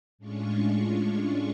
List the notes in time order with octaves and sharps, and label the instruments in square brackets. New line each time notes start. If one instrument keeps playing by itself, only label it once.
[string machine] A2 G#3 C#4 D4 F4 C#6